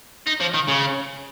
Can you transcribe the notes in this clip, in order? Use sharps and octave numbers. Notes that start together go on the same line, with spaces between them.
D#4
F3
D#3
C#3